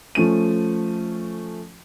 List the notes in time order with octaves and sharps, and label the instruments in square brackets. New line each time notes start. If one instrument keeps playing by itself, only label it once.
[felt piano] F3 A3 C#4 D#7